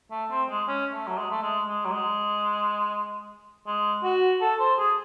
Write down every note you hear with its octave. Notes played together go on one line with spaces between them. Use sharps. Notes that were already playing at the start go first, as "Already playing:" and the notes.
A3
C4
G#3
C#4
A3
F#3
G#3
A3
G#3
G#3
F#3
G#3
G#3
F#4
A4
C5
G#4